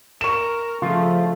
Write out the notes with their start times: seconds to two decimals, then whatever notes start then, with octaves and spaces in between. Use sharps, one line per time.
0.21 A#4 C#6 E7
0.82 C#3 F3 A3 F4